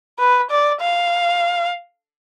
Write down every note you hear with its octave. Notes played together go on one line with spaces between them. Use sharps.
B4
D5
F5